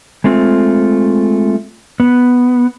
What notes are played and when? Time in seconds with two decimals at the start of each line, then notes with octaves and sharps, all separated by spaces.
0.24 G#3 A3 C4 F4
2.00 B3